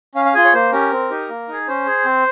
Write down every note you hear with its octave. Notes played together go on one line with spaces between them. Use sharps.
C#4 F5
F5
F4 G#4 G#5
C#5
A#3 C5
C#4 G4 A#4
C4
D#4 G4
A#3
D#4 G#4
C#4 C5
G#4
C4